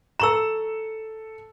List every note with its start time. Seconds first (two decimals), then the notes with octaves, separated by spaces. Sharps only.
0.20 A4 A#5 C#6 E6 E7